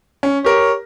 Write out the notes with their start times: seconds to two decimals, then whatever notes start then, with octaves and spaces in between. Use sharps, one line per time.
0.23 C#4
0.45 G4 A#4 C#5